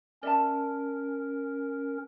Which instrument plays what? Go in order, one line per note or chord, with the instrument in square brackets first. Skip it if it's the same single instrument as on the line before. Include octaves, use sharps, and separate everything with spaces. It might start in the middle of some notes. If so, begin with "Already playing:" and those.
[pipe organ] C#4 A#4 [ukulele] D5 E5 A5